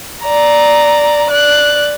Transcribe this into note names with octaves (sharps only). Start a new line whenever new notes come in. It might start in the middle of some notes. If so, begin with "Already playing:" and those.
D5 A#5
D5 F#6